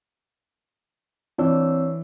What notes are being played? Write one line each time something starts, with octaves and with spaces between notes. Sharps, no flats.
E3 C4 D4 C#5 E6